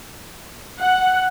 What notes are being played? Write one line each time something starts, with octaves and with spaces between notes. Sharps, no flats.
F#5